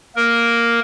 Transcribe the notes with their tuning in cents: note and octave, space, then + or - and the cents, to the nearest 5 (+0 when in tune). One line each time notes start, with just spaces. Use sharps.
A#3 +0 A#4 +0